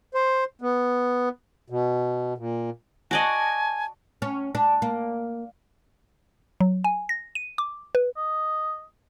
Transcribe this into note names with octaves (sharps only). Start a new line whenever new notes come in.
C5
B3
B2
A#2
F#4 D5 D#5 G#5 A5
C#4
D4
A#3
F#3
G#5
A#6
D#7
D6
B4
D#5